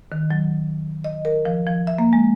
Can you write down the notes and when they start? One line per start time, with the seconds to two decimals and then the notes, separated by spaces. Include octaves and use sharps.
0.12 D#3
0.31 F#3
1.04 D#5
1.25 A#4
1.45 F3
1.67 F3
1.87 E5
1.99 A#3
2.13 G#3